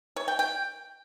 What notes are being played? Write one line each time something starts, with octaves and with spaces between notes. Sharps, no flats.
C#5
G5
G5